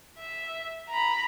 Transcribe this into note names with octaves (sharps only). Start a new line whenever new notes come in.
E5
A#5 B5